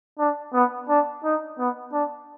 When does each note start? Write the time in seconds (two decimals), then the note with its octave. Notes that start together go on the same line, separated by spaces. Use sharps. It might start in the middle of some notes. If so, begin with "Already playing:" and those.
0.19 D4
0.54 B3
0.89 D4
1.24 D#4
1.58 B3
1.93 D4